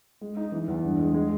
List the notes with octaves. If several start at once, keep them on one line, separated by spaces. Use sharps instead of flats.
G#3
D#4
E3
E2
G2
G#3
G#3